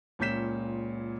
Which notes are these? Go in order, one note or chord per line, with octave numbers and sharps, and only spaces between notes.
C#2 A#2 C#4 G6 B6 E7